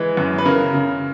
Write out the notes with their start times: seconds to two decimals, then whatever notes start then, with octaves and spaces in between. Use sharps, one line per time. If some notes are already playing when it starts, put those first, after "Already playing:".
Already playing: E3 G#3
0.17 F#2
0.38 B4
0.45 C#3 A#4
0.74 C#3